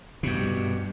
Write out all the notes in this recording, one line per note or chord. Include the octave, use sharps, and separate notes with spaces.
G2 B2